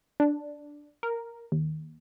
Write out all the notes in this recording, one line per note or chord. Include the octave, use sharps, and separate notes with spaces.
D4
A#4
D#2